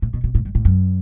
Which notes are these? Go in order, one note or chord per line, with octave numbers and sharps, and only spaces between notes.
A2
B2
B2
A2
G2
A2
F#2